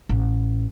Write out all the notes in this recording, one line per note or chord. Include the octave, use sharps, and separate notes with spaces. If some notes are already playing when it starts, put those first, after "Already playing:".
A1